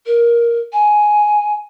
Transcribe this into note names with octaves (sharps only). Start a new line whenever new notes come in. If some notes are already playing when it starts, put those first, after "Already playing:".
A#4
G#5